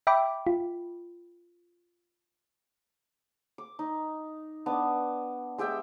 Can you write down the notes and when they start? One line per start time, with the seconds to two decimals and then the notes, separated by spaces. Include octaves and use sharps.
0.07 E5 G5 B5 D6
0.47 F4
3.58 D6
3.79 D#4
4.66 B3 D4 D6
5.58 G#3 G4 E5 G5